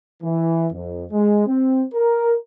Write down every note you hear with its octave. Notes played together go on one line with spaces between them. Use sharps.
E3
F2
G#3
C4
A#4